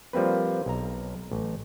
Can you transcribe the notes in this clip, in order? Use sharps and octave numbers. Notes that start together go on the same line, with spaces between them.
F3 G3 A#3 C4 B4
B1 A#5
A1